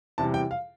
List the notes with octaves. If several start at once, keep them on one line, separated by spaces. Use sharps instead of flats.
E2 C3 E3 G3 A5
G5
F5